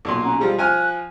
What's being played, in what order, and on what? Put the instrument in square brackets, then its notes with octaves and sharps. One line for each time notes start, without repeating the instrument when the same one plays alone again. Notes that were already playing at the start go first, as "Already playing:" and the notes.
[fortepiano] B1 A#2 C6
[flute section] C#4 F#5 A#5
[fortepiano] F3 G3 G#3 [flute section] F4
[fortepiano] F3 G#5 F6 [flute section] F#6